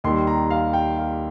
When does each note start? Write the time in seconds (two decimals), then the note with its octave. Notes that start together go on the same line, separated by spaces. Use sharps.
0.04 D#2 D#3 G3 C6
0.27 A#5
0.50 F5
0.73 G5
0.97 F5